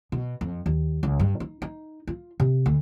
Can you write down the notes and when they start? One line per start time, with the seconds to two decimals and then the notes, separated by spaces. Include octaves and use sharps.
0.12 B2
0.41 F2
0.66 D#2
1.03 C#2
1.20 G2
1.40 D#4
1.62 D#4
2.07 F4
2.40 C3
2.66 D2